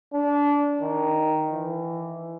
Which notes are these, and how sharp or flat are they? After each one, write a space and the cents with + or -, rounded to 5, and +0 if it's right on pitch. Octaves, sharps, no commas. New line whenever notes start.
D4 -25
D#3 +0
E3 +20